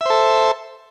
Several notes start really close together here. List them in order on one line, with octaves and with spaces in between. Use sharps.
E5 C5 A4